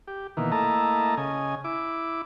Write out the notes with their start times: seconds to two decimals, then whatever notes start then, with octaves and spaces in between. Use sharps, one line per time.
0.07 G4
0.37 B2 D#3 E3 A#3
0.52 A3 A#3 E4 D#5 A5 A#5
1.17 C#3 D#5 G#5
1.64 E4 D6